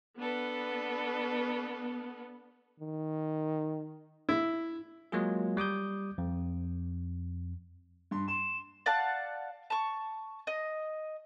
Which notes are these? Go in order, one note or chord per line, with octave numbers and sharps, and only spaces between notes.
B3 D4 A4 B4
D#3
E4
F#3 G#3 A#3 F4 G#4
G3 D6 D#6 G6
F2
G2 C6
C6 E7
D5 F5 F#5 A5
A5 C#6
D#5